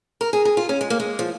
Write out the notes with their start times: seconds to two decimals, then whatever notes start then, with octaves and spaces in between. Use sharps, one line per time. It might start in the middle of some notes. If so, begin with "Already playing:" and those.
0.21 A#4
0.33 G#4
0.45 G#4
0.57 F4
0.69 C#4
0.81 G#3
0.90 A#3
1.00 G#3
1.19 F3